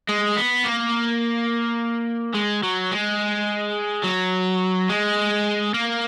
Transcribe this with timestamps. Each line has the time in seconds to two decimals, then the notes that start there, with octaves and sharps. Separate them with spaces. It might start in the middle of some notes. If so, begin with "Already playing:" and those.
0.09 G#3
0.36 B3
0.64 A#3
2.35 G#3
2.63 F#3
2.91 G#3
4.04 F#3
4.90 G#3
5.74 A#3